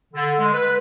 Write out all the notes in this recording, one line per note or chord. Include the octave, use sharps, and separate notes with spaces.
D3
G#3
B4